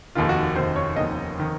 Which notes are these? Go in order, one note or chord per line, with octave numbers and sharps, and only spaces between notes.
F1 D#2 D#3 F4
F#4
F1 D#2 D#3 C5
C#5
F1 D#2 D#3 D#5
D#3